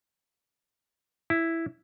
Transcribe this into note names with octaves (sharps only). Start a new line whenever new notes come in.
E4